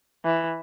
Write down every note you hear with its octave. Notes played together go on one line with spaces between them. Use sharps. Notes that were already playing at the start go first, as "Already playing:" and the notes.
E3